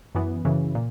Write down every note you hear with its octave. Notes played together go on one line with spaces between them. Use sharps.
F#2 E3 B3
F#2 C#3 E3
A#2